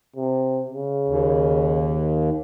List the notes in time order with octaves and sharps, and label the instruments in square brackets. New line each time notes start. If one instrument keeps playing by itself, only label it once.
[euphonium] C3
C#3
[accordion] D#2